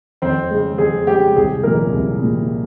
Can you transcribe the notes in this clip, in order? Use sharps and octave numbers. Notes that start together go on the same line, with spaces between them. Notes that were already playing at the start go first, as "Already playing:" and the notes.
F2 C4 C5
C#3 G#3
F2 G#4
C#3 G#3 G4
C2 G#4
A#2 F3 G#3 A#3 A#4
C2
A#2 F3 G#3